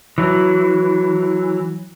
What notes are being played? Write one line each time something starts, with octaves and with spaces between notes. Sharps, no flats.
E3 F#3